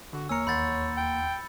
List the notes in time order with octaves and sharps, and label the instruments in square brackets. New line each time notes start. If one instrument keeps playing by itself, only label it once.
[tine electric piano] D3 [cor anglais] F#4
[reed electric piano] E2 A#3 A#5 [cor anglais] C#5 [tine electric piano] G#5 F6 [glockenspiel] E6 C#7
[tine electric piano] D#2 F#5 C6 [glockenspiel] B5 G6 A6
[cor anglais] G5